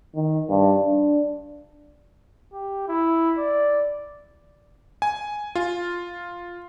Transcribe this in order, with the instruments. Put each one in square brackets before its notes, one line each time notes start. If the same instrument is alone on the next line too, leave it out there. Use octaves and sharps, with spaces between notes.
[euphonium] D#3
G2
D4
[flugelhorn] G4
E4
D5
[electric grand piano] G#5
F4